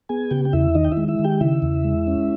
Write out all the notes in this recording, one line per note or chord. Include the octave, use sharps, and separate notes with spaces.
B3 G#4 G#5
C#3 G4 G5
G5
E2 E4 E5
D#3 D#4 D#5
G5
E4 E5
G#3
E4 E5
D#3
G4 G5
C#3 E4 E5
E2
G#3
C#4